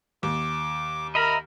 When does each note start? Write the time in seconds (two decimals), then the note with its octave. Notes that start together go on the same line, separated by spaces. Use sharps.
0.23 D#2 D6
1.15 A#4 D#5 E5 A#5 B5